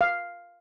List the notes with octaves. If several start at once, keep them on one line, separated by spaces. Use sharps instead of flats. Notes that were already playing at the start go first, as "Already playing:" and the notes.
F5